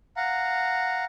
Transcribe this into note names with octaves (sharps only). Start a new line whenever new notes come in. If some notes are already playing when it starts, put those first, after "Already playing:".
F5 F#5 A#5